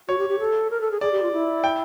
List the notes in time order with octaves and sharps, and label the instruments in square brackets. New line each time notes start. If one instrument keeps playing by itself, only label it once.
[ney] F#4 [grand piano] C#5
[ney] G4
G4
A4
A#4
A4
G#4
[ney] G#4 [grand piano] D5
[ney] G4
F4
E4
[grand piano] G5